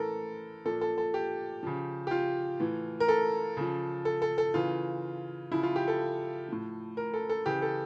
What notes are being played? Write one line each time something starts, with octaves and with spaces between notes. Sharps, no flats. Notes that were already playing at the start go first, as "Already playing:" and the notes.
Already playing: A2 E3 A4 A#4
A#2 F3 A4
A4
A4
G4
C#3 F3
G4
F4
A2 E3
A#4
A4
C#3 F3
A4
A4
A4
C#3 E3 F4
C#3 F3 E4
F4
G4
A4
A2 F3
A#4
A4
A4
C#3 E3 G4
A4